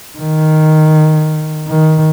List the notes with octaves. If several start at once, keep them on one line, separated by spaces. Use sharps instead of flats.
D#3
D#3